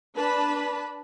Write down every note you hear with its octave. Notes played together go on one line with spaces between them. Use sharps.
D4 B4 A5 B5